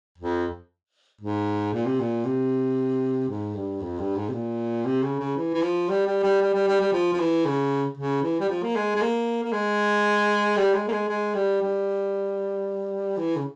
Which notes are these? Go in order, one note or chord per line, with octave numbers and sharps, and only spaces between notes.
F2
G#2
A#2
C3
A#2
C3
G#2
G2
F2
G2
G#2
C3
A#2
C3
C#3
C#3
E3
E3
F3
G3
G3
G3
G3
G3
G3
G3
F3
F3
E3
C#3
C#3
E3
G3
F3
A#3
G#3
G#3
A#3
A#3
G#3
G3
G#3
A#3
G#3
G#3
G3
G3
E3
C#3